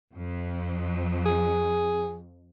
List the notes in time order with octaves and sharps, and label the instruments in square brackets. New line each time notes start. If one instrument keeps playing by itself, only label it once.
[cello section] F2
[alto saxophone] G#4